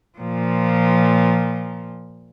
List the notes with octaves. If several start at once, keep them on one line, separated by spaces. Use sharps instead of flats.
A#2 F3